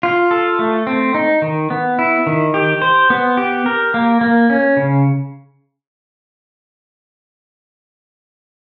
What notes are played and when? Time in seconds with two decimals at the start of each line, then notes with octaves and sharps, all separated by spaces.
0.03 F4
0.31 A4
0.59 A3
0.87 C4
1.15 D#4
1.42 D#3
1.70 B3
1.99 E4
2.27 D#3
2.54 G4
2.82 C5
3.10 B3
3.37 G4
3.66 A#4
3.94 A#3
4.21 A#3
4.50 C#4
4.77 C#3